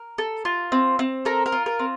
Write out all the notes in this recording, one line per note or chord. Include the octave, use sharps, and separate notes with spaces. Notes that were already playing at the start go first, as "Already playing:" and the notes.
Already playing: A#4
A4
F4
C4
C4
A4 A#4
A#4
F4
A#4
C4